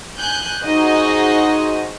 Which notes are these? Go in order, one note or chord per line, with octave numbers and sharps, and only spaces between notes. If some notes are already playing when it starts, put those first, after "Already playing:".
G#5 F#6 G6
D#4 F#4 G#4 C5 D#5